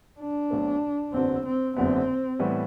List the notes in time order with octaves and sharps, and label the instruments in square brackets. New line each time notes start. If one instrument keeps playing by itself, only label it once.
[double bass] D4
[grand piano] B1 B2 A3 C4
[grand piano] F#1 E2 D3 F#3 B3 [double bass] C4
[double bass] C4
[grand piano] F#1 E2 D3 F#3 B3 [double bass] C4
[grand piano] A2 E3 G3 B3